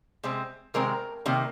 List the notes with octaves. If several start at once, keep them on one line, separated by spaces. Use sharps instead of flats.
C3 G#3 C4
C3 D#3 G#3 C4 A#4
C3 D#3 A#3